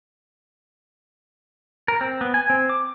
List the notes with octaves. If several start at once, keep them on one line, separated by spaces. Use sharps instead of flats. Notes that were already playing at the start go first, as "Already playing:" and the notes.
A#4
C4
B3
G#5
C4
D6